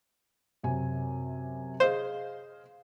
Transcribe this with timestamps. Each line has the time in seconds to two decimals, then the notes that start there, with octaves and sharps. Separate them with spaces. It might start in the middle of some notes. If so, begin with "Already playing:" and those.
0.63 F#2 C3 G#5
1.80 G#4 C5 D#5 F5